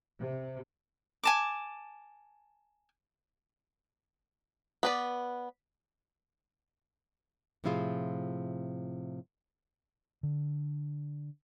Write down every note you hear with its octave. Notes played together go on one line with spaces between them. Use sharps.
C3
G#5 A5 D6
B3 B4 D5
A2 C3 F3 E4 F4 G#4
D3